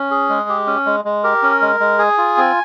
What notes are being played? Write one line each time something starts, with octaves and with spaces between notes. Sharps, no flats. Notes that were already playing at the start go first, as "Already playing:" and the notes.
Already playing: C#4
G#4
G#3
G4
C#4
G#3
G#3
G4 A#4
C#4
G#3
G#3
G#4 G#5
F4
C4